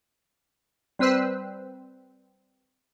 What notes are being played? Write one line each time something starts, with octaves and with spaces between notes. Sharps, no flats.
G3 C4 B4 C5 E6 F#6